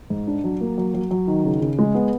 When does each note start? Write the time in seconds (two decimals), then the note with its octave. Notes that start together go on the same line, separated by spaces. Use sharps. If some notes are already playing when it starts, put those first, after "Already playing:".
0.10 G#2
0.27 D4
0.44 F#3
0.61 A#3
0.78 F#3
0.94 F#3
1.11 F#3
1.27 D#3
1.45 C#3
1.61 C#3
1.79 G#3
1.94 B3